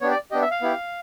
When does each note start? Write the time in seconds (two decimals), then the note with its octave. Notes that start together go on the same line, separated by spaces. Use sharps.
0.01 B3 D4 G4 C#5
0.11 D5
0.31 B3 D4 G4 D#5
0.42 E5
0.51 F5
0.62 B3 E4 G4